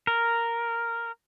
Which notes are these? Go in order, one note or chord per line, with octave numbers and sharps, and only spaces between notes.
A#4